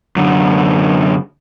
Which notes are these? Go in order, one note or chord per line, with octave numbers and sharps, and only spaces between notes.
F#2 D3